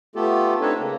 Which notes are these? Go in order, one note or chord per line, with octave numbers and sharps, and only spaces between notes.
A3 B3 F4 G4 A4
C4 D4 D#4 A4 B4 C#5
C#3 A#3